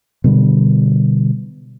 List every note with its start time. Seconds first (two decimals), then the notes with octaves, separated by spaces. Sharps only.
0.24 B2 D3 G3